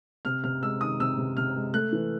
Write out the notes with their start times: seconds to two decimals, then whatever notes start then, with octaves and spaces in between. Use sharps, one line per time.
0.25 C3 F6
0.44 C3 F6
0.63 G#3 E6
0.81 D#3 D#6
1.00 C3 E6
1.18 C3
1.37 C3 F6
1.56 G#3
1.74 A3 F#6
1.92 E3